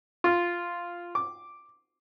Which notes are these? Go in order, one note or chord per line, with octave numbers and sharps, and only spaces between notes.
F4
D6